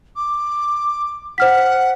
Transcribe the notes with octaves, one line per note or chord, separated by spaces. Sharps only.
D6
C5 F#5 F6 B6